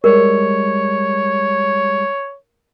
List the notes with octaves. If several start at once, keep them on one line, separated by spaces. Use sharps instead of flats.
G3 G#3 A#4 C#5